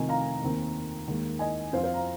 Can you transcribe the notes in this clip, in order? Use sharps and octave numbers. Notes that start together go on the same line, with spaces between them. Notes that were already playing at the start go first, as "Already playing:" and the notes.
Already playing: F1 F2 C3 D#3 D#5 G#5
F5 A#5
D#2 D#3 C4
D#2 D#3 G#3
D#5 G#5
F2 F3 C4 C5 F5
C5 F5
F5 A#5